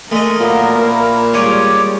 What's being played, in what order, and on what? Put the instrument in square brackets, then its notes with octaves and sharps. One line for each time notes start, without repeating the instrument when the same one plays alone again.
[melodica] G#3 G#4 [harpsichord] A3 D#5 [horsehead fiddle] A#4
[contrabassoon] A#2 [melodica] F#3 A#3 B3
[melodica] E4 F5
[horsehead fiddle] G3 G#3 [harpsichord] C#4 F4 [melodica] C#5 D5